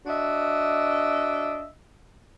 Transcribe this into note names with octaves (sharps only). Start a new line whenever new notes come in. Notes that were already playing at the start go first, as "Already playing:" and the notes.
D4 F#4 D#5 E5